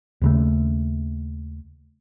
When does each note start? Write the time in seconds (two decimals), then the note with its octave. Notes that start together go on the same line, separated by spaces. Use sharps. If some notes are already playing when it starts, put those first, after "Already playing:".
0.21 D#2 C#3 A3